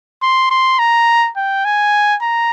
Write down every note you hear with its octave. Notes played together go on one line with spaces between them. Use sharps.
C6
C6
A#5
G5
G#5
A#5